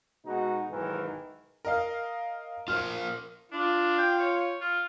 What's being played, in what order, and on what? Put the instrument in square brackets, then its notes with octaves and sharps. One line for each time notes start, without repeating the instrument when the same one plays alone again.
[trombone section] B2 G#3 D#4 F#4
B1 G#2 D#3 E3
[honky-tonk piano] A#4 D#5 F5
[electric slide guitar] F4 A#4 C5 [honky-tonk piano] F6
[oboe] D4 [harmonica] F4
[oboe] G5
C#5
F4